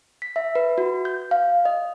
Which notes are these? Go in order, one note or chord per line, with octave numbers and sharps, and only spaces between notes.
B6
E5
B4
F#4
G6
F5
D#5